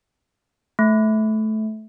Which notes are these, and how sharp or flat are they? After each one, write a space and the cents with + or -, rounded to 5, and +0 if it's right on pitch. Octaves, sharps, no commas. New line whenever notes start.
A3 -20